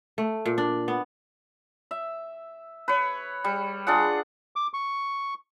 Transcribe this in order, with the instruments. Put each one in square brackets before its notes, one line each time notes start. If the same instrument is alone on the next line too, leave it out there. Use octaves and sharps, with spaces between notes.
[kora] A3
A#2
D4
B3
[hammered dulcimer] E5
B4 C#5
G3
D4 F4 G#4 F#5
[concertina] D6
C#6